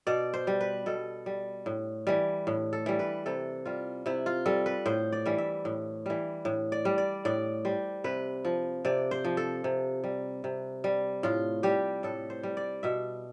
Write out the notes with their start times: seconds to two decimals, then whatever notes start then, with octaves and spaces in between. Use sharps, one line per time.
0.07 B2 D5
0.34 C5
0.47 G3
0.61 B4
0.86 B2 A4
1.26 G3
1.66 A2
2.07 E3 G3
2.47 A2
2.73 A4
2.86 E3 G3
2.99 B4
3.26 C3 A4
3.66 G3 F4
4.06 C3 E4
4.26 F4
4.46 G3 A4
4.66 B4
4.86 A2 C5
5.12 D5
5.26 E3 G3
5.38 E5
5.65 A2
6.06 E3 G3
6.45 A2
6.72 D5
6.85 G3
6.98 D5
7.25 A2 D5
7.65 G3 C5
8.04 C3 B4
8.45 F3
8.85 C3 D5
9.11 C5
9.24 F3
9.37 A4
9.64 C3
10.04 G3
10.44 C3
10.84 G3
11.23 A2 F4
11.63 G3 G4
12.03 A2 A4
12.30 C5
12.43 G3
12.57 D5
12.83 B2 E5